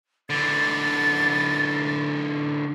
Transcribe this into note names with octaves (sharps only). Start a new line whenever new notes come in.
D3 E3 A6